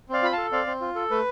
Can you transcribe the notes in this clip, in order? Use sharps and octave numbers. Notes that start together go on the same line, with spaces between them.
C4 D5 F5
F4 B5
A4 F5 A5
C4 D5 F5
C4
F4
A4
A3 B4